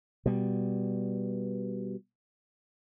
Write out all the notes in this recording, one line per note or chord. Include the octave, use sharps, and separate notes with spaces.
B2 G3